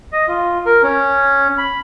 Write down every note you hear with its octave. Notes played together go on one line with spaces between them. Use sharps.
D#5
F4
A#4
C#4
B5